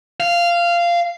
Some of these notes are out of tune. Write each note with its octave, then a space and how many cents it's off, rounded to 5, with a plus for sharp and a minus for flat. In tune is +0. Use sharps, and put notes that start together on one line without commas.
F5 -15